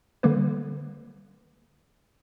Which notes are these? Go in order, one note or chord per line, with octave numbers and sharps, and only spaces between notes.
D3 G3 A#3 B4